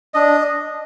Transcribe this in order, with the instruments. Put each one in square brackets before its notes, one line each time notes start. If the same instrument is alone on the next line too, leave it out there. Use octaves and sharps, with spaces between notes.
[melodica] D4 D#5